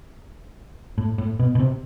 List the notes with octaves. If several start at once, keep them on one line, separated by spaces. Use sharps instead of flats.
A2
A2
B2
B2
C3